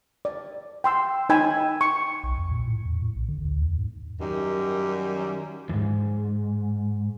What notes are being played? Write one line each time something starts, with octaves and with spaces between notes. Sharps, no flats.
D5
G5 C6 E6
D#4 G5 G#5 B5 E6
C#6
B1
F2
A#2
A2
E2
A2
A#1
D3
D2
E2
G#2
F#2 D#3 G3
E2 G#2